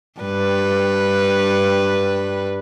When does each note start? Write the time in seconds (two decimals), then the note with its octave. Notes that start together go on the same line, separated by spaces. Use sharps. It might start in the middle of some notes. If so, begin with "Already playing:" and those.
0.20 G2 B4